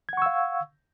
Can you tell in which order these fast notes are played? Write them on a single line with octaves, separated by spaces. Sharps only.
G#6 F#5 C#6 E6 F5